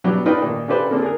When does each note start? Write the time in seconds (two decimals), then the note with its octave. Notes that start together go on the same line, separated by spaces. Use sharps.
0.04 B2 F#3 G3 B3 D4 G4
0.26 D4 D#4 F4 B4 G5
0.42 A#2 D#3 D4 D#4
0.68 C#3 D4 G4 A4 B4 C5
0.90 D3 A#3 C4 D4 G#4 A4
1.02 G#4 A#4